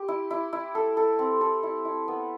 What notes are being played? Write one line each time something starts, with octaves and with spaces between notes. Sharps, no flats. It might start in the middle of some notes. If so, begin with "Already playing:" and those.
Already playing: G4
E4
E4
E4
A4
A4
C4
A4
E4
E4
B3